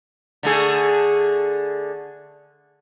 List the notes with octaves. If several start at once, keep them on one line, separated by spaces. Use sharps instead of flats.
D3 A3 G#4